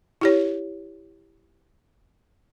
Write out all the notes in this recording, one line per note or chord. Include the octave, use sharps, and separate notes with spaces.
E4 G4 C#5